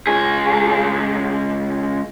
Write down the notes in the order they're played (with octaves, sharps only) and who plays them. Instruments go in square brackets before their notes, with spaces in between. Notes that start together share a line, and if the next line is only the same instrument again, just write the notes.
[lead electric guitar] C#2 G#4